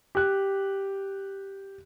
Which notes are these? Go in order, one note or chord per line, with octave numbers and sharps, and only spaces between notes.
G4 F#6